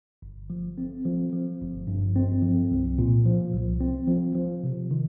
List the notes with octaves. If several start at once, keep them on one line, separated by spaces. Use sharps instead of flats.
G1
F3
C4
F3
F3
G1
G2
C4
F3
C2
A#2
F3
C2
C4
F3
F3
C3
D#3